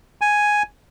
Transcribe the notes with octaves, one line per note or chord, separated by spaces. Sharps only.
G#5